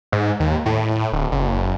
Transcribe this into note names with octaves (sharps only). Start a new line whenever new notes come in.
G#2
D#2
A2
D1
F#1